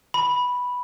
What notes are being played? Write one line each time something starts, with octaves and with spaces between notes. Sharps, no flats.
B5